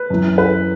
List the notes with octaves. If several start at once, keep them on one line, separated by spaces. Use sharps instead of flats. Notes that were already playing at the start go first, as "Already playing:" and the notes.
Already playing: B4
F#2 E3
B4